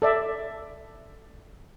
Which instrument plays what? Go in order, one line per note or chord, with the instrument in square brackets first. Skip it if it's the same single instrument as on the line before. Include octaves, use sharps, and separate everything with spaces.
[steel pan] A4 D5 E5